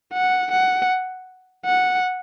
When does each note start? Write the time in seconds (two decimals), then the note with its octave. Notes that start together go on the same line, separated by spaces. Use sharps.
0.13 F#5
0.51 F#5
1.65 F#5